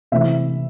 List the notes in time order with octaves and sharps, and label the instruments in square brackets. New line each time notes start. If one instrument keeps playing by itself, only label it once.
[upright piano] C3 E3 A3 C4 E4 E5